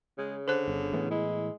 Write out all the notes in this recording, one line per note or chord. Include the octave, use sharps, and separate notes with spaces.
C#3 G#3
D3 C5 F#6
G1
A2 E3 B3
G#3 E4